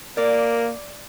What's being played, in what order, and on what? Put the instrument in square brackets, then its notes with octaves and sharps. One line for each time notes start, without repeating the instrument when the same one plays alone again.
[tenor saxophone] A#3 [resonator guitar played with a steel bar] D5